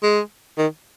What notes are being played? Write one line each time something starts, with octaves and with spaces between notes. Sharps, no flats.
G#3
D#3